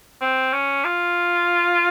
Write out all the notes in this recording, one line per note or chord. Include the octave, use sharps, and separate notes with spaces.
C4
C#4
F4